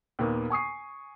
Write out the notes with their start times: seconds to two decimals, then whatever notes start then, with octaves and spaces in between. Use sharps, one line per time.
0.19 D#2 A#2 A#3 B3
0.50 G#5 C#6 D#6 C7